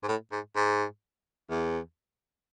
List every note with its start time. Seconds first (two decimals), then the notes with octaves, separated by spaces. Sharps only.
0.03 G#2
0.08 A2
0.32 G#2
0.56 G#2
1.51 E2